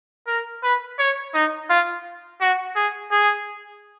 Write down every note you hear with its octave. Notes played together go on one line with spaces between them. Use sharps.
A#4
B4
C#5
D#4
F4
F#4
G#4
G#4